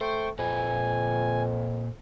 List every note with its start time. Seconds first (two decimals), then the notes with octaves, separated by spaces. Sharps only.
0.01 A3 C5 G5 C#6
0.39 F2 A#2 B4 G#5